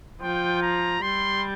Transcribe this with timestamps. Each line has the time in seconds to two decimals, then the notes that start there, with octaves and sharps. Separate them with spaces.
0.21 F3 G5
0.62 A#5
1.02 G3 C6